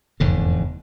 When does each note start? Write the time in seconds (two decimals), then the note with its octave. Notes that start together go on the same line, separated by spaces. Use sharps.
0.20 F1 E2 G#2 D3